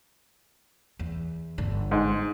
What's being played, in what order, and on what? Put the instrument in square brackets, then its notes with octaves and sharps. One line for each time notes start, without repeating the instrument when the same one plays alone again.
[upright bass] E2
G1 D3
[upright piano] G#2